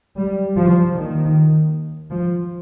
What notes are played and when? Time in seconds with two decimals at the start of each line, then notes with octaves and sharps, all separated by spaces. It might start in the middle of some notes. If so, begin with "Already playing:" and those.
0.18 G3
0.56 F3
0.95 D#2 D#3
2.10 F3